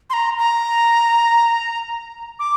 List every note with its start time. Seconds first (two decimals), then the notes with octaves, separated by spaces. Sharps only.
0.10 C6
0.13 A#5
0.38 A#5
2.39 D6